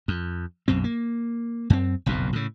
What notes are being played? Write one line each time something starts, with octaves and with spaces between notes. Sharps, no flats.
F2
B1 F#2 B2 C4
A#3
F#2 C4
F#1 B1 F2 A#2
A2 C#3